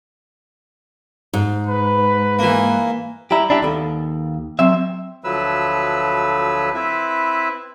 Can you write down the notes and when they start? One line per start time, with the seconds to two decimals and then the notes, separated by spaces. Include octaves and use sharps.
1.33 G#2
1.67 B4
2.39 E3 A#3
3.31 G3 E4 G4 A#5
3.50 D4 E4 G4
3.62 D#2 B3 A4
4.59 F#3 C4 E5
5.24 D2 F3 F#3 A3 B4 E6
6.74 C4 E4 B4 E5